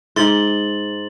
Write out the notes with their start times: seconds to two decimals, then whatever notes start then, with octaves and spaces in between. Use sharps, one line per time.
0.16 G#2 C6 A6 F#7